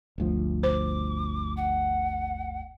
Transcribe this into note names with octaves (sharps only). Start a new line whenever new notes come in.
G1 D2 F3
C5 D6
F#5